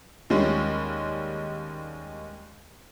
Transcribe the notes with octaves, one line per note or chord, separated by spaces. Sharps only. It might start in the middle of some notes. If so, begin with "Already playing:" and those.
D#2 G3 G#3 C#4